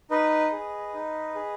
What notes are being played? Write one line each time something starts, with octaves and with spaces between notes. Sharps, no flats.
D#4 B4 D#5
G#4
D#4
G#4